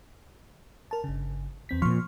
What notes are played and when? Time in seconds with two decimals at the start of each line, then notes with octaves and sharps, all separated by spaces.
0.91 A#4 A5
1.04 G1 C#3
1.69 E2 C4 B6
1.82 A#2 F3 C6 C#6 F6